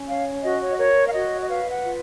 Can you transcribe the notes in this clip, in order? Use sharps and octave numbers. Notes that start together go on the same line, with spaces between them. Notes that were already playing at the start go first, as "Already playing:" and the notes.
Already playing: C#4
C#5 F5
F#4 D#5
C#5
D#5
A#4 C#5
F5
F#4 D#5
D#5
B4 F5
F#5
F4